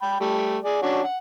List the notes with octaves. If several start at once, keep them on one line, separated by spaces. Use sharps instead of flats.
G5 B5
G3 A3
G#4 D5
C#4 D4 F#4
F#5